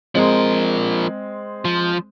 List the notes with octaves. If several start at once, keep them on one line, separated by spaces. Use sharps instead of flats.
F3 G#3 C4 A#4
F3